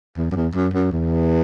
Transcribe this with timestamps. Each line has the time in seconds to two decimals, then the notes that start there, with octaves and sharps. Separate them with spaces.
0.17 E2
0.32 F#2
0.36 E2
0.55 F#2
0.74 F#2
0.92 E2